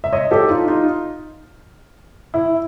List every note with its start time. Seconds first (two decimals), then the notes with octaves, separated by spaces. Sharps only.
0.04 E5
0.13 C#5 D#5
0.31 G4 A4
0.49 D#4 F4
0.68 D#4 F4
2.34 E4